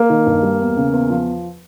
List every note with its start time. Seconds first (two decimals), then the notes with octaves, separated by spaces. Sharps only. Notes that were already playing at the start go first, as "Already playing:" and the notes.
Already playing: A#3
0.10 D#3
0.27 G2
0.43 G3
0.60 E2
0.77 C#3
0.93 E2
1.10 F3